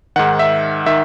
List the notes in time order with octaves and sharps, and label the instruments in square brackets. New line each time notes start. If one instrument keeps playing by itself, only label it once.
[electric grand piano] G#2 D#3 F#5
E5
D#3 E5